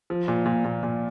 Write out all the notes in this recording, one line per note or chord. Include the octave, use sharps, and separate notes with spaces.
F3
A#2
A#2
A#2
A#2